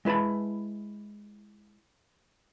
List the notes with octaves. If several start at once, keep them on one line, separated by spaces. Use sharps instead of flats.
G#3 E4 B4 A5 B5